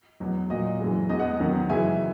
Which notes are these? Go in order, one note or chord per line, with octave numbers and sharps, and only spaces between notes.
E2 B2 F#3
A#2 F#3 D#5
F#2 E3 G#3
E2 B2 G#3 D#5
D#5 F#5
E2 D#3 F#3
F#2 C#3 E3 G#3 E5 G#5